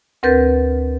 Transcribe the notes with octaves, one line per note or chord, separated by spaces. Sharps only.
D2 C4 A#4 B4 G6 A6